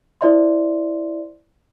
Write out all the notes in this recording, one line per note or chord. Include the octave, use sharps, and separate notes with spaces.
E4 C5 D5 E5 C6